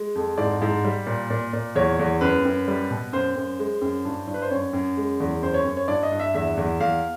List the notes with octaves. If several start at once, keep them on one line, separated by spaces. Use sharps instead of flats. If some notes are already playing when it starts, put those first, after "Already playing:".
Already playing: G#3
F2
G#2 D5
G#2
G3
A#2
A#2
A#2
E2 C#5
E2
F#2 B4
F#2
G3
B2
F#2 C5
F#2
G#3
F#2
G2
G2
B4
C5
F#2 C#5
F#2
G#3
E2
F#2 C5
C#5
F#2
C#5
G2 D5
D#5
G2
E5
E2 E5
E2
E2 F5